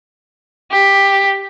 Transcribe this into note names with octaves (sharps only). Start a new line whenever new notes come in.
G4